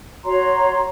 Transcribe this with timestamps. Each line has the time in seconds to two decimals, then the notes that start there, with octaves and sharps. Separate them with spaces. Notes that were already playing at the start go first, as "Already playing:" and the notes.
0.24 F#4 C#5 A#5 C6